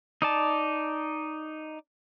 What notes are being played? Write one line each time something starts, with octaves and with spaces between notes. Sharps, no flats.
D#4 D5 A5